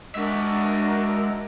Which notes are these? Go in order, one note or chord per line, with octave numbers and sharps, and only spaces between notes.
G#3 D4 F#4 A#4 E5